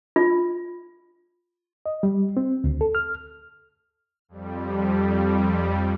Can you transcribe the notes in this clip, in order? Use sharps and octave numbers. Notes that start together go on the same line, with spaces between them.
F4
D#5
G3
C4
D2
A4
F6
F2 G3